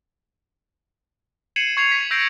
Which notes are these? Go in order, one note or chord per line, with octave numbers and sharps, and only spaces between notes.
G#6 C7 C#7 D#7 E7 F#7
C#6 G#6 C7 F7
B6 C#7
E6 G6 A#6 C7 D7